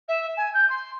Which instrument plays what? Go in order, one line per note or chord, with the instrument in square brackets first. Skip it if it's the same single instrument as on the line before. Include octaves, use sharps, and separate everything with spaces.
[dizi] E5
G#5
G6
C6